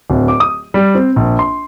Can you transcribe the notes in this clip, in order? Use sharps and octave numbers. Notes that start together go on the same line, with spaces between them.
D1
D6
D#6
G3
C4
A#1
C6